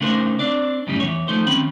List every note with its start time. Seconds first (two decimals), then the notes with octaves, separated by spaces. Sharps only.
0.01 C#3 A3 D4 D#4 A#4 C5
0.39 C4 D4 D5
0.87 F#2 A2 C#3 G3 D#4
1.00 E2 C#5
1.28 F3 A3 D#4 C5
1.47 D#3 C4 C#4 B5